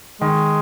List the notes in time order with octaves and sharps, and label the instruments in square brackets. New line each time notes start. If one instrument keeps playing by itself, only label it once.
[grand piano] D#3 [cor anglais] G#3